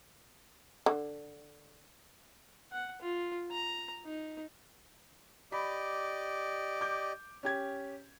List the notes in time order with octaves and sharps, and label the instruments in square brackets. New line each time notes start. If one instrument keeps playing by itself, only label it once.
[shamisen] D3
[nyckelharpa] F#5
F4
A#5
D#4
[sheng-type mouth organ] G4 D5 D#5 [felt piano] B5
[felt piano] D6 G6
C#4 G4 G#6